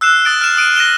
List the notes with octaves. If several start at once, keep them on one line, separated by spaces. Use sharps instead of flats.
E6 F#6 C7 E7
D#6 A6 D7
F6 E7
D#6 D7 D#7
A#6 D#7 E7 G7